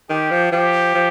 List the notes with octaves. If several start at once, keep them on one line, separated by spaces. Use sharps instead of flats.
D#3 G4
F3
F3 G4
F3